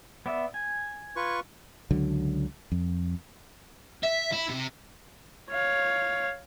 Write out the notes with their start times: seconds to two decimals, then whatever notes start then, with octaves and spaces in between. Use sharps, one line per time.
0.26 B3 D5 E5
0.54 G#5
1.16 F4 B4 C#6
1.91 C#2 D3 F#3
2.72 F2
4.03 E5
4.33 E4
4.49 C3
5.51 C#5 F5